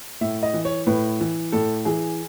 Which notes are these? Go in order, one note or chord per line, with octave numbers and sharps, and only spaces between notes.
A2 E5
D#5
E3
C#5
A2 B4
E3
A2 A4
E3 G#4